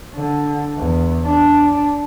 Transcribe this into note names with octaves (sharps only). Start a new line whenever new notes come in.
D3
E2
D4